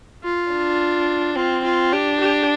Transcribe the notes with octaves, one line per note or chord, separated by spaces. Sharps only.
F4
D4
C4 F4
F4
D4 G4
G4